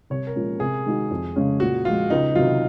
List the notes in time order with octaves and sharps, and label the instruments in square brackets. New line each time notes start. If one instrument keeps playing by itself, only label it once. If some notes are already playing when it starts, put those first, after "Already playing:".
[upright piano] C2 [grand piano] C#5
[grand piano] A#4
[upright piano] A#2 F3 G#3 C#4
[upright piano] C3 [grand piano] G#4
[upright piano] D#3 G#3 D#4 F#4
F2
C#3 G#3 C#4
[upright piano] A#2 [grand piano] F#4
[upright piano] F3 G#3 [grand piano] F4
[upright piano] C#2 [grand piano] D#4
[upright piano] C3 D#3 F#3 [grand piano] F4